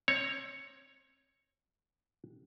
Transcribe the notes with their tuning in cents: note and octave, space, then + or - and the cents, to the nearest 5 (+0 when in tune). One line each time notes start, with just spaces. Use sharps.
C4 +30 C#5 +0